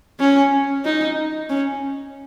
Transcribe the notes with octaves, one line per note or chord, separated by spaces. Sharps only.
C#4
D#4
C#4